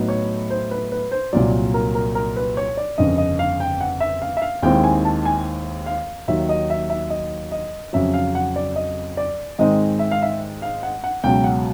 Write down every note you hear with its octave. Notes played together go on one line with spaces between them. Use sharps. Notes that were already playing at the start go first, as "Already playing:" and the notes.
Already playing: A2 F#3 B3 D#4
C#5
C5
B4
B4
C5
C2 A#2 F#3 D5
A#4
A#4
A#4
B4
C#5
D5
G1 F2 C#3 D#5
D#5
F5
G5
F#5
E5
F5
E5
F5
D#2 D#3 G#3 C4 E4 G5
G#5
A5
G#5
F5
D#2 D#3 F#3 E5
D#5
E5
E5
D#5
D#5
F2 C#3 F#3 E5
F5
F#5
D5
D#5
D5
G#2 D#3 G#3 C4 D#4 D#5
E5
F5
E5
F5
F#5
F#5
C#2 B2 F#3 G5
F#5